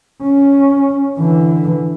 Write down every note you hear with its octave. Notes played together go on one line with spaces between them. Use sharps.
C#4
D3 E3